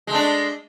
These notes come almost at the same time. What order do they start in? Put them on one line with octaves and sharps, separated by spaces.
G#3 A3 D4